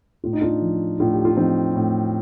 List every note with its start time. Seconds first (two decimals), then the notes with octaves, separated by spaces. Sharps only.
0.24 A2 F4
0.33 D#4
0.42 D4 F4
0.62 F3
1.00 A2 D4 F4
1.13 G4
1.25 F4
1.37 F3 C4 D#4
1.76 A2